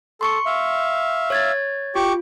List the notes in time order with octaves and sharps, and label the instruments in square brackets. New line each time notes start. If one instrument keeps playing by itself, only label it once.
[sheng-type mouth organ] A4 [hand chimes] C6 C#6 C#7
[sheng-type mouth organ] E5 F5
[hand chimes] C#5 G#6 A6
[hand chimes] F4 [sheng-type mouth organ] G4 C#6 D6